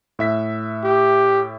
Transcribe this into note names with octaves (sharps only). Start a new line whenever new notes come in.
A2 E5 B6
G4